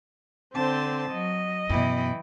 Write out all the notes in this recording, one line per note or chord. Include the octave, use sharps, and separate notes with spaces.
D3 C4 C5 A5
F#3 D#5
F#2 B2 E3 E4 G5